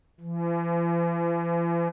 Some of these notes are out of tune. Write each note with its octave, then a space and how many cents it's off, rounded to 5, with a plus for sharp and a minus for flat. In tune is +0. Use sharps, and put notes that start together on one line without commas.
E3 +45